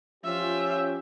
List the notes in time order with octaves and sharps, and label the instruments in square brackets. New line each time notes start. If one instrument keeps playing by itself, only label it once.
[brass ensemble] F3 C#4 G4 [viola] F4 E5